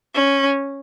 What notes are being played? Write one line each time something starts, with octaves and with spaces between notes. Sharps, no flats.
C#4